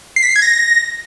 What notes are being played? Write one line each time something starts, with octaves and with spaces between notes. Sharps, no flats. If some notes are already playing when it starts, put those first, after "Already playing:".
C7
B6
C7
G#6
A#6